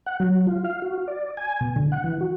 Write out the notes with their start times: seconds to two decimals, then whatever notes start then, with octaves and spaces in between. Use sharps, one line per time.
0.06 F#5
0.20 F#3
0.47 F4
0.64 F5
0.82 F#4
1.08 D5
1.37 G#5
1.61 B2
1.76 D3
1.92 F#5
2.04 E3
2.21 F#4